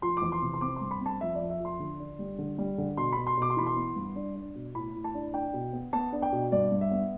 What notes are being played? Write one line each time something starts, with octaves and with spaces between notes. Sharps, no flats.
F3 C6
E2 D6
C6
C3
C6
C4 D6
G2 C6
B5
C4
A5
F2 E5
D5
F2
E5
F3
C6
D3
D4
G3
D3
G3
D3
B2 C6
B2 B5
C6
B2 D6
C6
E3 B5
C6
B3
G2
D4
D4
B2
A2 B5
A2
A5
D4
D4 G5
B2
B3
B3 A5
D4
G5
B2
G2 D5
G2
E5
B3